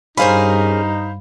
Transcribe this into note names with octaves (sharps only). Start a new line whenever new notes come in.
G2 C#4 D#4 G#4 A#4 C5 F5 B5